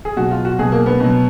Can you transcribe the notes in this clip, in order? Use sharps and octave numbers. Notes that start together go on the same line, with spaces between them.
G#4
B2 F#3 F#4
F4
F#4
B2 F#3 G#4
A#3
B3
B2 F#3